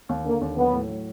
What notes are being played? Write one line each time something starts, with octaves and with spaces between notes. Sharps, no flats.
D#2
D3 A#3
D#2
F#3 B3
A2
F#3